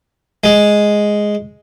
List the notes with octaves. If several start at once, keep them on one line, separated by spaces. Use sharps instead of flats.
G#3